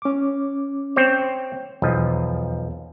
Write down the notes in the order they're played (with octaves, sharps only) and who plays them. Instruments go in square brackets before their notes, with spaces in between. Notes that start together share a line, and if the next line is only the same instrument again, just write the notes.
[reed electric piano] C#4 D6
[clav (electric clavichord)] C4 C5 C#5
[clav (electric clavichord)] B1 F3 D#5 [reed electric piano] E2